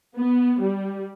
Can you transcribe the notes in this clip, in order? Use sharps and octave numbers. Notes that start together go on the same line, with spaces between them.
B3
G3